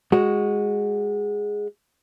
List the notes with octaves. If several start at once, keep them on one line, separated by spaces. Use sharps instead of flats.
G#3 F#4